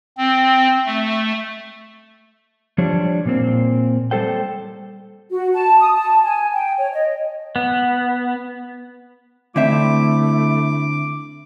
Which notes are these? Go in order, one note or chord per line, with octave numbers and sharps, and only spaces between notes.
C4
A3
F3 G3 D4 C#5
A#2 A#3 C4
G3 G#3 A4 C5 G5
F#4
A5
D#6
A5
G#5
G5
C#5
D#5
B3
D3 A3 C4 E4 E5 D6